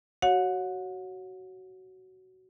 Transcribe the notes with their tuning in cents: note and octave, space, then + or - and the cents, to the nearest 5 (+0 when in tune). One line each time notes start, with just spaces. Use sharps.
F#4 +15 C#5 +0 F#5 -35